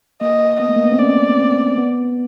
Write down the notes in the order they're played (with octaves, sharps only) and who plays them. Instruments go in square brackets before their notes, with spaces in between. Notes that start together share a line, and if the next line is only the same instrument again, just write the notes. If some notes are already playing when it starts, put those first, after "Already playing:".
[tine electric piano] A#3 [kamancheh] D#5
[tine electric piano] B3 [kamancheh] D#5
[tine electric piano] A3
A#3
B3
C4
[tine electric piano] C#4 [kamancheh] D5
[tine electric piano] C4
B3